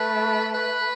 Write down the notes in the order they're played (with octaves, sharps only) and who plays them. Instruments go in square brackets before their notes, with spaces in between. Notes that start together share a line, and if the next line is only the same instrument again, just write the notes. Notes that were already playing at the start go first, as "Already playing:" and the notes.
Already playing: [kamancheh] A3 [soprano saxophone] B4
[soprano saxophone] B4